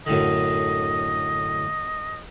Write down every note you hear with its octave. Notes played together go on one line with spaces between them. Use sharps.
F#2 A2 D3 D#5